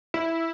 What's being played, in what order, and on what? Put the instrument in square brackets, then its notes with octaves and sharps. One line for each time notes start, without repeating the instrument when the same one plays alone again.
[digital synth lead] E4